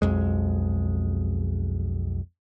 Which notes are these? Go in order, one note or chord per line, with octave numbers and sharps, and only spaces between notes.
B1 F2 G#3